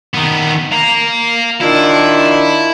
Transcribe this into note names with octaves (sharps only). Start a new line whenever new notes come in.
D#3 B3
F5 A#5
D#3 D4 E4 F4